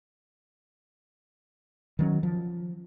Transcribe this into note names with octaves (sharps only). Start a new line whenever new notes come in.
D#3 F#3 C#4
F3